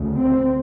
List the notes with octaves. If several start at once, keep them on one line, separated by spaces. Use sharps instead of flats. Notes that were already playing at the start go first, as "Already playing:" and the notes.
Already playing: D2 C#3
C4